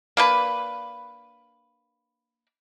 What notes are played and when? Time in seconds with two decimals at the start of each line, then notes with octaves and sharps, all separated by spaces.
0.17 A#3 D4 B4